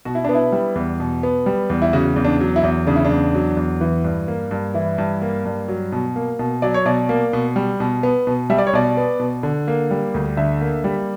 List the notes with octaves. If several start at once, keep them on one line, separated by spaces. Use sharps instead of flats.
B2 F#4
E4
B3 D4
E4
G3
E2
B2
B3
G3
E2
E4
C#3 F#4
E2
D4
F#3
E4
E2
C#3 D4
E4
D4
E2
F#3
E2
E3
G2
A#3
G2
E3 E4
G2
A#3
G2
F#3
B2
A#3
B2
F#3 D5
C#5
B2 D5
A#3
B2
G3
B2
B3
B2
G3 E5
D5
C#5
B2 D5
B3
B2
D3
A#3
G3
D2
D3 E5
A#3
G3